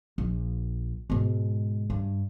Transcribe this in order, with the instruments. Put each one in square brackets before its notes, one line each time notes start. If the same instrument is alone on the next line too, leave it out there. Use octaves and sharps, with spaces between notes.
[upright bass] A#1
G#2 B2
G2